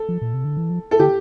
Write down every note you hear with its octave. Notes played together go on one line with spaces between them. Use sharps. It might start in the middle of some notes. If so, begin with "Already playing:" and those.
Already playing: A4
F3
A#2
C3
D3
E3
F3
A4
D3 G4